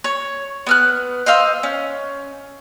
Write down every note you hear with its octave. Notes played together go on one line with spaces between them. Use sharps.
C#5
B3 F6 F#6
C5 D#5 F5 E6
C#4